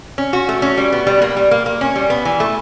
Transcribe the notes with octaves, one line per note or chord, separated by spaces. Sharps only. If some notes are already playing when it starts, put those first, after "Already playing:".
C#4
F#4
A3
C#4
G3
B3
G3
A#3
G3
A#3
A#3
C#4
G3
B3
E3
A3